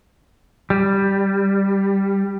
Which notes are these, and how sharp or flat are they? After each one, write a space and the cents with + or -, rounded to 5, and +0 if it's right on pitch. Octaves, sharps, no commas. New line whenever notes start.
G3 +0